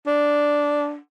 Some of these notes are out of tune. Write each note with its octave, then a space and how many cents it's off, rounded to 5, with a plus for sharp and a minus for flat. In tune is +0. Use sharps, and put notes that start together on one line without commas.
D4 -5